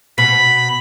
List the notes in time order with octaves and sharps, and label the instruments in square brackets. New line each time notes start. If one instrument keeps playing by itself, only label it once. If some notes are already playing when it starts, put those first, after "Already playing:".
[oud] B2 [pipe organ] B5